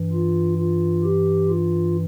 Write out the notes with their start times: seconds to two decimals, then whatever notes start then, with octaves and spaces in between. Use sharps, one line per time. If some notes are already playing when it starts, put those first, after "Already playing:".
Already playing: G2 E3
0.12 F4
0.58 F4
1.04 G4
1.49 F4